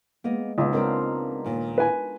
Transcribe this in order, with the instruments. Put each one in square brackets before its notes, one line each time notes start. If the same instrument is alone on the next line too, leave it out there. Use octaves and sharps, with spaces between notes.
[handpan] G#3 [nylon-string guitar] A#3 B3 D#5
[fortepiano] C#2 [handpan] B3 D#4 [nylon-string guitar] F4
[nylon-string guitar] C4 C5 G5 [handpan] D4 F4 A#4
[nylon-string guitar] D#2 A#2
[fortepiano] B4 G#5